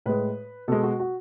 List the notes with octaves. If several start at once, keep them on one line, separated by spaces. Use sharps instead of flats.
A2 G#3 B4
B2 G#3 A4
F#4
F#4